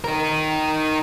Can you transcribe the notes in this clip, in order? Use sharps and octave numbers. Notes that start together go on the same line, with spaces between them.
D#4 A#4